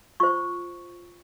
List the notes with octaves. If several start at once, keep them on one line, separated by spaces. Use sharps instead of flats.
F4 C5 C#6